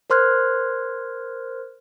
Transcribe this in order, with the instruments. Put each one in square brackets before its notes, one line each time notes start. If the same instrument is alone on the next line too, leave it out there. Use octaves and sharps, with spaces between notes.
[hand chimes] A#4 C5 C6 F6 F#6 G#6